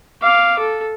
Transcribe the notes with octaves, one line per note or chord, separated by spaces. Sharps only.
F5 D6
A4